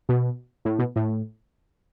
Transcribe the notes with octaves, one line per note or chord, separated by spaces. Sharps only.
B2
A2
B2
A2